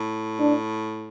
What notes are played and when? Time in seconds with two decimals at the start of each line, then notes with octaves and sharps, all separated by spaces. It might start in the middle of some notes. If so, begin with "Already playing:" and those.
Already playing: A2
0.39 D4